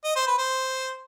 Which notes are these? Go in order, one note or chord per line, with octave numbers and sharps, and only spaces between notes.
D#5
C5
B4
C5